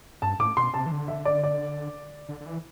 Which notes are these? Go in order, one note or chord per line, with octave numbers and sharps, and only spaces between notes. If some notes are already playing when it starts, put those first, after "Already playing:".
G2 A5
A2 D6
B2 C6
C3 A5
E3
D3
E5
D5
D5
D3
D3
E3